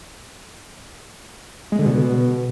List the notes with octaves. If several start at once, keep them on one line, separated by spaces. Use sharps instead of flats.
G#3
D3
B2